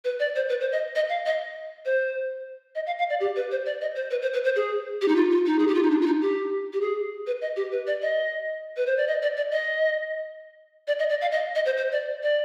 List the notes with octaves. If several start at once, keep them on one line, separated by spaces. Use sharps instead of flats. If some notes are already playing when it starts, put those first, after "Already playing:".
B4
D5
C5
B4
C5
D#5
D#5
F5
D#5
C5
D#5
F5
F5
D5
G4
B4
C5
D5
D#5
C5
B4
C5
B4
C5
G#4
G4
D#4
F4
F4
D#4
G#4
G4
F4
D#4
D4
F4
D#4
G4
G4
G#4
B4
D#5
G4
B4
D5
D#5
B4
C5
D5
D#5
D5
D5
D#5
D5
D#5
D5
F5
D#5
D#5
C5
C5
D5
D5